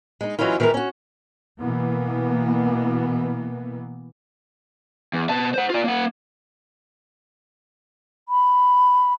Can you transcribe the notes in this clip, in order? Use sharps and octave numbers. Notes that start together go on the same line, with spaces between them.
G#3 D#4
E3 F#3 G#3 C#4 E4 F4
D#3 E3 G#3 E4 A#4
C#4 F#4
B2 E3 A#3 B3
E2
B2 A5
C5 F#5
F4 D5
A#3 F#5
B5